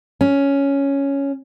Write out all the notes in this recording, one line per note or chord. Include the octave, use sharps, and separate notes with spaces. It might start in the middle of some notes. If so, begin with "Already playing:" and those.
C#4